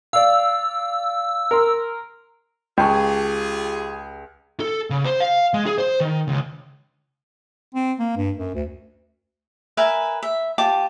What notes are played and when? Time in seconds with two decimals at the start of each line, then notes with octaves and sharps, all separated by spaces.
0.13 D5 F5 E6
1.51 A#4 C6
2.78 C#2 F4 G4 G#4 G5 A5 C#6
4.60 A4
4.90 C#3
5.05 C5
5.20 F5
5.54 G#3
5.66 G#4
5.78 C5
6.00 D#3
6.28 C#2
7.74 C4
7.99 A#3
8.17 G2
8.38 F#2
8.55 D2
9.77 A#4 B4 E5 G#5
10.23 E5
10.58 F4 G4 A5 D6